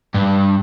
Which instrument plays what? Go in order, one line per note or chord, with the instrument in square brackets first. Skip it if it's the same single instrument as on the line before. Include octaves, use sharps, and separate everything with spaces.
[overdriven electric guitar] G2